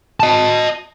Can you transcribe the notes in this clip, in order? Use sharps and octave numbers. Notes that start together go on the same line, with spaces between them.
D#5 A5